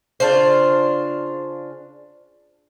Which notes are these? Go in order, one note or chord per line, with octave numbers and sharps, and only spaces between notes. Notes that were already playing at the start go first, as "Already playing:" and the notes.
C#3 D4 F4 C5